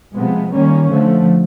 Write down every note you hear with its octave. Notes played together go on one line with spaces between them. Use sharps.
C3 F3 G#3 B3
D#3 G3 A#3 C#4
D3 F3 A3